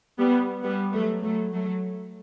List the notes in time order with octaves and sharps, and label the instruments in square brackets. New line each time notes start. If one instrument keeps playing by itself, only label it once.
[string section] G3 B3
G3 B3
F#3 A3
F#3 A3
F#3 A3